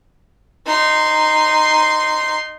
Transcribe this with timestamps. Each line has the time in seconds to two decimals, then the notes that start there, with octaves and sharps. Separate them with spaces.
0.67 D#4 C6